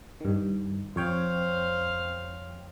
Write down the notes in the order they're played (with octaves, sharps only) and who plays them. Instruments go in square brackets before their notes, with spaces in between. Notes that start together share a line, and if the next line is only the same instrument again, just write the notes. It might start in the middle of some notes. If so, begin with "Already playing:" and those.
[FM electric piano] G2 D#3
[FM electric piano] F2 C#5 G5 [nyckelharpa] C5 F5